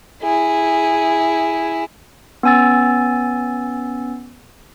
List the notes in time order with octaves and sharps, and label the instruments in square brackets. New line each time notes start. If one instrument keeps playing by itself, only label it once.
[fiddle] E4 G#4
[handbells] B3 C#4 G#5 E6 A6